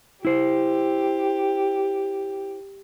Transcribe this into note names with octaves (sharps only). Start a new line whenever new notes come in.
E4 G4 C5